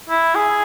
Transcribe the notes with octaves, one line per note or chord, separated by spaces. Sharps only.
E4
G#4